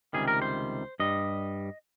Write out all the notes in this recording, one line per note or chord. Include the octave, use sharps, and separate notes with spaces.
C#2 C3 D#3 G3 G#4
A#4
C5
G2 G3 D#5